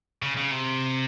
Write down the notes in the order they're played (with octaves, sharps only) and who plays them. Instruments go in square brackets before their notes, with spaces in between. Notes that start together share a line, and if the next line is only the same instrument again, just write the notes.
[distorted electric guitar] C#3
C#3
C3